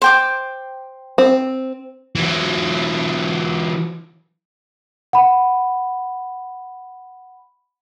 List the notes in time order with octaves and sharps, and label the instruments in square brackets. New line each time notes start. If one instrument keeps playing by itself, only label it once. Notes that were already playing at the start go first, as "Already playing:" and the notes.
[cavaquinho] C5 G5 D6
[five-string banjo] C4
[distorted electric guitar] E3 F#3
[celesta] F#5 B5